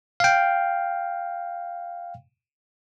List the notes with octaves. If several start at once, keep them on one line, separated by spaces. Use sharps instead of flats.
F5 G5